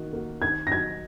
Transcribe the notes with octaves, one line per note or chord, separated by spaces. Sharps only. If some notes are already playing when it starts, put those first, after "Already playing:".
Already playing: D#3 A#3 F#4
A#3 F#4
D#3 G#6
A#6
F#3 D#4 F#4 G#6